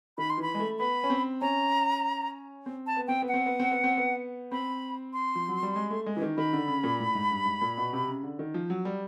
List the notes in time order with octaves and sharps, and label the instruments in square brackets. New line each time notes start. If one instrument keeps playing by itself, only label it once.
[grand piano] D#3 [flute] B5
[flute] C6
[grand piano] E3 [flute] B5
[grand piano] G#3
A3
[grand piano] B3 [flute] B5
[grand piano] C#4
C4
[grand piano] C#4 [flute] A#5
[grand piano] C4
[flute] A5
[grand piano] B3
[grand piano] C4 [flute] G5
[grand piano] B3
[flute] F#5
[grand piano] C4
B3
C4
B3
C4
B3
[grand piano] C4 [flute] B5
[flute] C6
[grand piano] F3
F#3
G3
G#3
A3
G#3
E3
D#3
[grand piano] D#3 [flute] B5
[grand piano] D3
C#3
A#2
A2
G#2
G2
G#2
A#2
B2
C3
C#3
D3
D#3
F3
F#3
G3